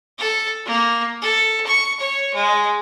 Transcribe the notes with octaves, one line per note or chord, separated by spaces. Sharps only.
A4
A#3
A4
C#6
C#5
G#3